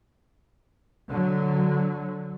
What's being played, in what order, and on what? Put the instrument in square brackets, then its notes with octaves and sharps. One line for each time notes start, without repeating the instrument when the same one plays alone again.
[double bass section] D3 F#3